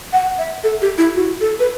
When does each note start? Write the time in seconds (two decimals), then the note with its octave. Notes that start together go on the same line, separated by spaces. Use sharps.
0.13 F#5
0.39 E5
0.64 A4
0.82 G4
0.98 E4
1.15 F#4
1.41 A4
1.60 B4